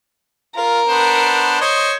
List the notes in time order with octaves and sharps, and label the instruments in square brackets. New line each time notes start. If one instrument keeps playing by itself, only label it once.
[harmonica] F4 [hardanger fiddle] A#4
[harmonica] B3 D4 C5
C5 C#5 D#5